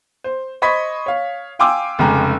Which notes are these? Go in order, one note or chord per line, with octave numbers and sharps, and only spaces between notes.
C5
C5 D#5 B5 C#6 G#6 B6
C#5 F5
F5 G5 G#5 C6 D6 E6
F1 C#3 G#3 G5 A#5